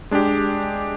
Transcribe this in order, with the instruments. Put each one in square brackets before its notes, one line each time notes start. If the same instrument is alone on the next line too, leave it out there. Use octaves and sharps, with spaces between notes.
[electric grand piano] G#3 D4 G4